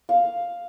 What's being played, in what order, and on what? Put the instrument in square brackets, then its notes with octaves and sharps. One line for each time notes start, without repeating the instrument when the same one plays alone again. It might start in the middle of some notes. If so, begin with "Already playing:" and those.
[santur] F5